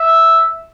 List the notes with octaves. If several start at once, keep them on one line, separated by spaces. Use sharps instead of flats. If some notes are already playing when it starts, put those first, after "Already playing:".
Already playing: E5